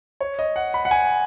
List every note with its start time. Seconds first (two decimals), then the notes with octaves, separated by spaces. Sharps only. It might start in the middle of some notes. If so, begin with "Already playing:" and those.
0.20 C#5
0.39 D#5
0.56 F#5
0.74 B5
0.85 F#5
0.91 G#5